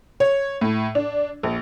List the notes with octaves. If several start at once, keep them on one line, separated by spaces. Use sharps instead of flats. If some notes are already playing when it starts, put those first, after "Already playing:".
C#5
A2
D4
A#1